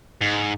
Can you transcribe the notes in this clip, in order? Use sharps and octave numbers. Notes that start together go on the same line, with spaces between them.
G#2